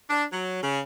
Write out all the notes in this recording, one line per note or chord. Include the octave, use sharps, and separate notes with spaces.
D4
F#3
C#3